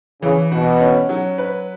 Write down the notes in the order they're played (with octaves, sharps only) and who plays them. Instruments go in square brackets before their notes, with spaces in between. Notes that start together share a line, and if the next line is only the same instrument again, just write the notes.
[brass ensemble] C#3 [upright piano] E3
[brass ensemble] B2 [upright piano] F#4
[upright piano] C#4
F#3
B4